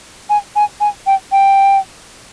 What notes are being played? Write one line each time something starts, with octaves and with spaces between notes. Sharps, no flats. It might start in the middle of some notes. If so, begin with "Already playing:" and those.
G#5
G#5
G#5
G5
G5